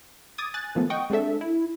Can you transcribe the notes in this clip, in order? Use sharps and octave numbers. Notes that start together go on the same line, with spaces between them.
D6 D#6 G#6 A6
G#5 F#6 A6
D#3 F3 A3 B3
D#5 F#5 G5 C#6 D#6
G#3 C4 D4 A4 E5
E4